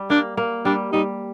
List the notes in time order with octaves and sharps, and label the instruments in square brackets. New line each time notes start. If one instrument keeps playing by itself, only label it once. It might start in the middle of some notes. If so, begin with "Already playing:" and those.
Already playing: [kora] G3
[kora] A#3 [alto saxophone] D4
[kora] A#3
[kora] G3 [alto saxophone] D4
[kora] G3 [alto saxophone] D#4